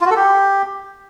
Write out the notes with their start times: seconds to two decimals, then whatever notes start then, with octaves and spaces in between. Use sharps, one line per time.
0.01 F4
0.06 F#4
0.11 A4
0.16 G4